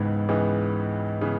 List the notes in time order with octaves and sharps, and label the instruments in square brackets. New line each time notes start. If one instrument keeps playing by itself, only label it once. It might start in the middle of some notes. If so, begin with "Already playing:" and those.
Already playing: [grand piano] C#2 C#3 E3 B3 [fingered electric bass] G#2
[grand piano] C#2 C#3 E3 B3
C#3 E3 B3